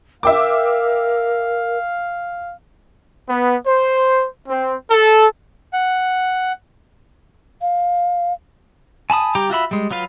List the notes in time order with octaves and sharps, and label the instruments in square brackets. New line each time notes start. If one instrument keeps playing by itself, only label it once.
[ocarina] A#4 [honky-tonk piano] E5 G5 D6 [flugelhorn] F5
[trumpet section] B3
C5
C4
A4
[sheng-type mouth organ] F#5
[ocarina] F5
[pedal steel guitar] G#5 A5 B5 D#6
G3 G4 G5 A#5 D6
F4 F#4 E5 B5
G3 G#3
F#3 F4 B4 F5